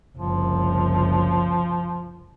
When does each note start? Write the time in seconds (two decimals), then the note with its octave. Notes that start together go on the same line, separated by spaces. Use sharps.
0.17 F#1 C2 F3